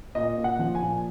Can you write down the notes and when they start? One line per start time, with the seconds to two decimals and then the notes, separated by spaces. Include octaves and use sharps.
0.15 A#2 D#5
0.38 A#2
0.44 F#5
0.59 F3
0.75 G#5
0.82 A#2